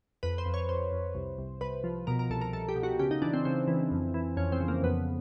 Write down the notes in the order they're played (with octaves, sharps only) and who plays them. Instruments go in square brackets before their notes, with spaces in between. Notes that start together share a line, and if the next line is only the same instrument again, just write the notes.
[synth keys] F2 B4
C5
F2
C#5
F2 C5
F2
C2
C2
C2 B4
F3
B2 A#4
A#4
C2 A4
A#4
C2 A4
G4
B2
F#4
C#3 G4
D#4
E3 D4
C4
C#3 C4
E3
F2
E3
F2 C#4
C4
C#3
A#3
F2 B3